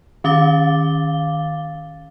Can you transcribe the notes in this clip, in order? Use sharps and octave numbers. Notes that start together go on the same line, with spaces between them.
D#3 C#4 F5 D6 A6 G7